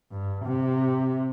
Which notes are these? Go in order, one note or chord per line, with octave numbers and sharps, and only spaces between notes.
G2
C3